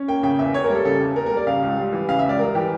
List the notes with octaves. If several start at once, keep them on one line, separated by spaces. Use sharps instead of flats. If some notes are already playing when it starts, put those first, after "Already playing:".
Already playing: C#4
A#3 G5
C#3 G5
E2 E5
A#3 C#5
A#4
G3
A4
C#3 A4
E2
A#3 A#4
A#4
G3
D5
C#3 F5
C#2
G3
E3
C#3 F5
E5
C#2
D5
G3 A#4
E3 G4